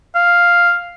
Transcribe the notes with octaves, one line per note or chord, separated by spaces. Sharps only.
F5